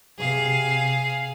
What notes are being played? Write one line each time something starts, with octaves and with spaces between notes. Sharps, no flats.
C3 G#4 F5